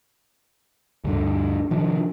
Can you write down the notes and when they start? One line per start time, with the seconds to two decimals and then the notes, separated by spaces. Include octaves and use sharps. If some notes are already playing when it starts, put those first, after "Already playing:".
1.04 D2 G2 D3
1.71 C3 D#3 F3 D4